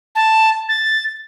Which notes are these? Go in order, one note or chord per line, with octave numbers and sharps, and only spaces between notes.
A5
A6